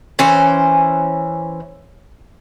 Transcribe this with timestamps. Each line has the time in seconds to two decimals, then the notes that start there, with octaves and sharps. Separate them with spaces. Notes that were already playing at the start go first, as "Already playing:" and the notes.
0.19 E3 C#4 C5